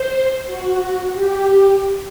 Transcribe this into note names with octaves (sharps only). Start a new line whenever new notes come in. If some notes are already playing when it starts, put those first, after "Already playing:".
Already playing: C5
F#4
G4